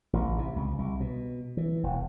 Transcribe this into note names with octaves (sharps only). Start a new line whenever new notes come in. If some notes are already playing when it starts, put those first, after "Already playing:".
A1
C3
C#2
C2
B2
E3
E1